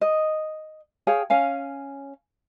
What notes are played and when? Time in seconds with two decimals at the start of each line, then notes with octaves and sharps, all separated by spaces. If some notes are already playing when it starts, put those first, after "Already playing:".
0.01 D#5
1.07 G#4 C#5 F5 G5
1.30 C#4 F5 G#5